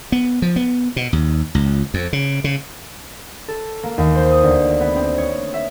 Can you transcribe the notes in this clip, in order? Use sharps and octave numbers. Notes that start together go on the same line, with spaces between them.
B3
F3
B3
B2
D#2
C#2
F2
C#3
C#3
A4
A#3
D#2
C5
D#6
D2
B3
C4
C#5
E5